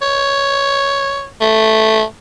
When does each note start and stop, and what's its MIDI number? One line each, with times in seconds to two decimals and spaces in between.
0.02 1.26 73
1.41 2.03 57